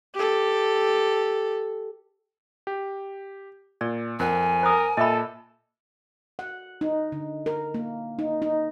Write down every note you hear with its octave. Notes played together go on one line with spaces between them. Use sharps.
G4 A4
G4
A#2 D5
F2 A#4 C5 F#5 G#5
A#4 C5 D#6
A#2 A4 D#5 E5 B5 E6
F#5
D#4
D3
A#4
A#3
D#4
D#4